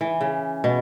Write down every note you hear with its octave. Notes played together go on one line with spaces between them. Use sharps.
E3
C#3
B2